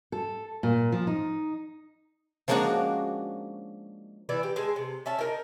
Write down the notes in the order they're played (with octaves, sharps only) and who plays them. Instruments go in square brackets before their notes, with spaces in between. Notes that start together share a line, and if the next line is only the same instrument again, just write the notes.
[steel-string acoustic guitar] A4
A#2
F3
D#4
[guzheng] F3 G#3 A#3 C#4 D4 F#4
[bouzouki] E3 B3 D5 E5
G4
G#3 G#4 A4
C3
C#4 E5 A5
D#4 A#4 D#5